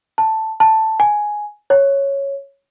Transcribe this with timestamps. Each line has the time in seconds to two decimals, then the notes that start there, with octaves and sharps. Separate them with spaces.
0.18 A5
0.60 A5
1.00 G#5
1.70 C#5